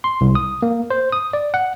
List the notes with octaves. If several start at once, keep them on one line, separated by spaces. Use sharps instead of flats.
C6
C2
D#6
A#3
C5
D#6
D5
F#5